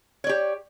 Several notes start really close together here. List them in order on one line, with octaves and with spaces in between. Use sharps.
C#5 D5 G4